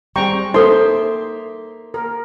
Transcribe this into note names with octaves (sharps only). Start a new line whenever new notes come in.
G3 C4 G#4 G5 A#5 C#6
A#3 D#4 A4 C5 E5 C6
A#4